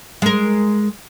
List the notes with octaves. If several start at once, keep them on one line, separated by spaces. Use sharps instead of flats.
G#3 A#4